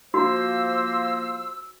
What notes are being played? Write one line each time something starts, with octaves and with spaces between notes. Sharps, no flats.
F3 A#3 F#4 C5 E6